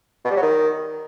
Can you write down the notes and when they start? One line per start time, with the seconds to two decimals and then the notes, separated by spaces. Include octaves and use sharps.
0.25 B2
0.31 G3
0.36 F#3
0.42 D#3